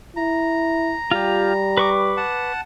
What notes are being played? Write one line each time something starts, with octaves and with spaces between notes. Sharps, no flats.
E4 A#5
G3 F4 G4
B4 C#6 D6
F#5 A5